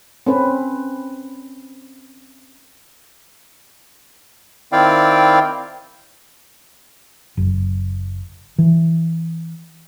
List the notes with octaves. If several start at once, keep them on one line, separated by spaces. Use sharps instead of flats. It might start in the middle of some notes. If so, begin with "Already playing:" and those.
C4 C#4 B4
D#3 C4 E4 D5 F5 G5
F#1
E3